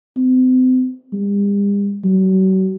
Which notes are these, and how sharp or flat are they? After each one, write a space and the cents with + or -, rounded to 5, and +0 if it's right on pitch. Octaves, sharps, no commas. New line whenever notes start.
C4 -40
G3 +45
F#3 +40